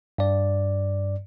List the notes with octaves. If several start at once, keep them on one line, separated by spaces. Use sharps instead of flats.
G2 D5